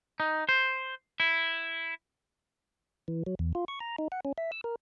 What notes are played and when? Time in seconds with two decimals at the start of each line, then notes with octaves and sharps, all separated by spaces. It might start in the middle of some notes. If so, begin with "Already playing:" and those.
0.20 D#4
0.49 C5
1.20 E4
3.08 E3
3.26 F#3
3.39 E2
3.55 F4
3.68 C#6
3.80 A#5
3.99 D#4
4.12 F#5
4.25 C#4
4.38 E5
4.52 E6
4.64 A#4